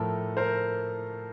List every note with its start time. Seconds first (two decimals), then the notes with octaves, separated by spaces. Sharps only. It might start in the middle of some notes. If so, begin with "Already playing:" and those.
Already playing: A2 F3 A3 A4 A#4
0.37 A#4 C5